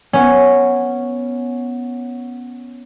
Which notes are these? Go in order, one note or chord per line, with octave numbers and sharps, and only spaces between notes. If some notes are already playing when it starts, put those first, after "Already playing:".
B3 C#4